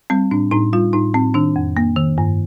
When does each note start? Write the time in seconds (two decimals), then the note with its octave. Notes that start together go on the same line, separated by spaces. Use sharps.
0.10 G3 C4
0.31 A2 D4
0.51 A2 D#4
0.73 G3 F4
0.93 A2 D#4
1.14 A2 C4
1.34 D#3 D4
1.56 F2
1.77 A#3
1.96 D#3
2.18 G2